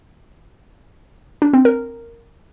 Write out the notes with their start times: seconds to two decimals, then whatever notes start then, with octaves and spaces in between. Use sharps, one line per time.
1.42 D4
1.53 C4
1.65 A#4